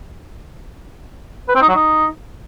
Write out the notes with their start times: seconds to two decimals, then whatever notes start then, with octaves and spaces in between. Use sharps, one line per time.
1.48 B4
1.55 C4
1.62 D#4
1.69 F#3
1.75 D#4